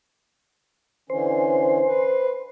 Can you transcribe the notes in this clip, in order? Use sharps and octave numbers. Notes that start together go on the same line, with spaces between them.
D3 E3 C#4 C5
B4